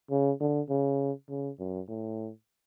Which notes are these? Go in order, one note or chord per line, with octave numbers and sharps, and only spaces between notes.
C#3
D3
C#3
C#3
F#2
A2